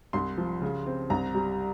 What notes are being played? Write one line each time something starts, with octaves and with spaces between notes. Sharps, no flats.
C2 C6
F3
C#3
C4
C2 A#5
G3